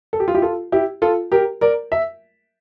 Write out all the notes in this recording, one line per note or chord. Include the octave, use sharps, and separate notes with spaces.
A4
G4
F4
E4 G4
F4 A4
E4 G4
F4 A4
G4 A#4
A#4 D5
E5